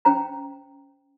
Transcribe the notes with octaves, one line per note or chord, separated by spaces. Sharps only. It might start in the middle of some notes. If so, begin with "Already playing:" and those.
C#4 C5 G5 A#5